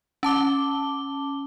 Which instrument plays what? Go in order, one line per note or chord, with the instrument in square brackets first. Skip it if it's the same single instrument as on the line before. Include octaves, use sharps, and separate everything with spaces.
[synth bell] C#4 A5 D6 G7